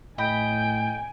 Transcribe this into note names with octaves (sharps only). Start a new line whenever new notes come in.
A2 D#5 G5 G#5 B5